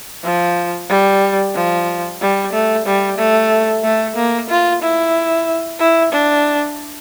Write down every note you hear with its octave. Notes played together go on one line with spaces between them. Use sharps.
F3
G3
F3
G3
A3
G3
A3
A3
A#3
F4
E4
E4
D4